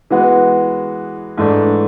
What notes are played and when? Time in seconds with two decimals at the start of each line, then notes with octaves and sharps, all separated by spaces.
0.10 E3 G#3 B3 F#4
1.38 G#2 E3 A3 D4